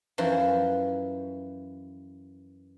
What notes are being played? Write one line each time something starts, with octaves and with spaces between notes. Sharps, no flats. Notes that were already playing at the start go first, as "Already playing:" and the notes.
F#2 E3 F3